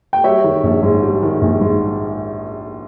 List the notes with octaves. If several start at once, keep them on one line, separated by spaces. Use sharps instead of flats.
G5
G3 C#5 E5
D#3
A#1
G#2
G3
D#3
A#1
G#2